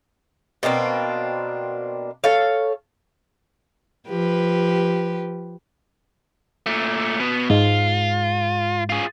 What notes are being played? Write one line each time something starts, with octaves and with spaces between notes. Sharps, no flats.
B2 A#3 C4 D4
A4 C#5 F5
F3 G4 B4
A#2 A3
B2 B3
G#2 G#3 F4
F4 G#4